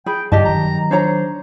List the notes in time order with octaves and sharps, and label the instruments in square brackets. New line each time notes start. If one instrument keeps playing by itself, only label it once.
[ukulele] G#4 B5 [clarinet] G5
[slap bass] G2 D3 [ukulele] G4 D#5 A5 [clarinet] D5
[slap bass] D#3 F#3 [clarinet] A#5
[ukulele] D4 C#5 A#5 [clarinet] C5